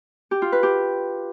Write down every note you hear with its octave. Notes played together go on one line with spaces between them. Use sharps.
G4
F4
B4
G4